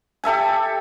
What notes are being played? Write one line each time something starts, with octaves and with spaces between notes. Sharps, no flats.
G4 A4 E5 G#5